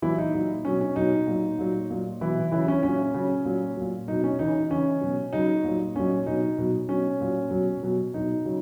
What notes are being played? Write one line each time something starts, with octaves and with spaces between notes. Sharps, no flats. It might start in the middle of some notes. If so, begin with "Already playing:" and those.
A#2 E3 F#3 E4
D#4
A#2 F#3
B2 F#3 C#4
C#4
B2 F#3 D#4
A#2 F#3
A#2 F#3
A#2 F#3
B2 E3 F#3 E4
C#3 E3 F#3 E4
C#4
A#2 F#3 C#4
C#3 F#3
A#2 F#3
A#2 F#3
B2 F#3 D#4
C#4
C#3 E3 D#4
C#3 E3 C#4
B2 F#3
C#3 F#3 D#4
A#2 F#3
A#2 F#3 C#4
B2 F#3 D#4
B2 F#3
B2 F#3 C#4
A#2 F#3
B2 F#3
B2 F#3
B2 F#3 D#4
C#3 F#3